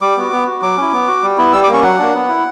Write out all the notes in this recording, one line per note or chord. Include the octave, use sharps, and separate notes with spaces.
G3 D6
B3 F#4
B3
F#4
F#3 D6
C#4 E4
B3
F#4
G3
B3 E4
G3 E6
D6
A#3 C#4 C#6
F#3 F#5
A#3 D4
B3
E4